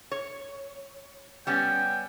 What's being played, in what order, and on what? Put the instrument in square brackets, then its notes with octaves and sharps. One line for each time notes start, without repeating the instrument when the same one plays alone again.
[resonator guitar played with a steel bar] C#5
[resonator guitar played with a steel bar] G3 B3 C#4 [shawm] G5